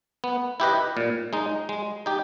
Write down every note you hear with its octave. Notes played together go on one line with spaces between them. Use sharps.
B3
E4 G4 B4 D#5
A#2
G#3 D#4
G#3
D#4 G4